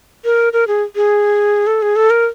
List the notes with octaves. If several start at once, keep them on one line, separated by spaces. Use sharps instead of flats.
A#4
A#4
G#4
G#4
A4
G#4
A4
A#4